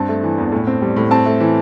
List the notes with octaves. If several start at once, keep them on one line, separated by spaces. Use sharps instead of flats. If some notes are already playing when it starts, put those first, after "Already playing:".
Already playing: G2 C4 A5
A3
E3
E2
A2
C4
G3
A2
C4 A5
A3
E3